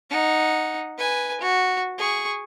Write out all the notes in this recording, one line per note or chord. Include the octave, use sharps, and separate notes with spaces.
D#4 F#5
B4 G#5
F#4
G#4 C#6